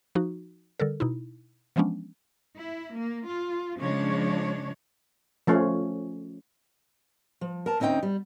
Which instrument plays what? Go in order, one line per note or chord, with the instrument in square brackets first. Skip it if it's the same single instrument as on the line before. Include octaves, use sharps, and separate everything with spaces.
[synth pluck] F3 D#4 F#4
D3 G3 A4 A#4
B2 D#4 E4
E3 F3 G#3 B3 C#4 D4
[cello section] E4
A#3
F4
C#3 F3 G#3 D4 C#5
[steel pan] F3 A3 C#4
[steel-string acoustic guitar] F3
A#4 A5
D2 C4 C#4 D#4 G5
G3